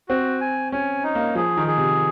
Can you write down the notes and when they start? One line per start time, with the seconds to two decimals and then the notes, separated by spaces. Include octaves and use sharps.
0.09 C4 F#4
0.41 G#5
0.72 C#4 G#5
1.04 D#4
1.15 A#3
1.35 F3 G#4
1.57 D#3
1.67 G#4
1.77 C3